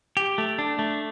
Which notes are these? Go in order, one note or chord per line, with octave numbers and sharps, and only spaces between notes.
G4
A3
D4
A3